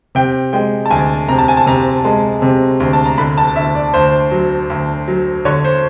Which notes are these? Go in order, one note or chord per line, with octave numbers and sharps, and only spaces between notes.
C3 G5
G#3 G5
A5
D2 G#5
C3 A#5
A5
G#5
A5
C3 A#5
G#3
C3
D2
A5
A#5
D3 B5
A5
D2 E5
D5
D2 C5
F#3
D2
F#3
D3 C#5
C5